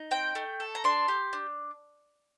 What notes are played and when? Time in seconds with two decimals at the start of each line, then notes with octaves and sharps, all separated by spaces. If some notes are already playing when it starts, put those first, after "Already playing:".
Already playing: D#4
0.11 C4 G5
0.35 A3
0.60 A4
0.75 A#5
0.84 D4 C6
1.08 G4
1.33 D4